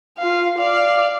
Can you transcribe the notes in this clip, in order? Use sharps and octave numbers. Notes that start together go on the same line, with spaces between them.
F4 F5
D5 F5